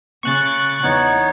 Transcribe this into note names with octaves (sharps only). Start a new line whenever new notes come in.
C#3 C#6 F#6 A6
E2 B3 D#4 C#5